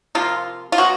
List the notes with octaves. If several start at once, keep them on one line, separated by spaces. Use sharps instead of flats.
C3 F3 A#3 F4
F4
B2 F#3 F#4